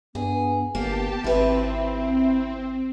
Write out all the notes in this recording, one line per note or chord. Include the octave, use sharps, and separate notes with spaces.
G2 B3 G#4
G1 A#3 B3 G4 A5
G#1 C4 E4 B4 E5